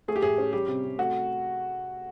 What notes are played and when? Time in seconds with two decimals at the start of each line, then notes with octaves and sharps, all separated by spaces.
0.08 A3 G#4
0.16 G4
0.22 A2 G#4
0.38 C#4
0.53 G3 G4
0.68 C3
0.83 C3
0.98 A3 F#4